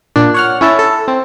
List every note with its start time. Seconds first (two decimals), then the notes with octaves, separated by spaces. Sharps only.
0.16 A#2 D4
0.34 C#5 F#5 F6
0.61 C#4 E4 A4 A5
0.79 A4
1.08 C4